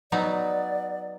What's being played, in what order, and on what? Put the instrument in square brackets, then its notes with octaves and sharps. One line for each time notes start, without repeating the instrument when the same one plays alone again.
[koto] F#3 B3 D#4 [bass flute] D5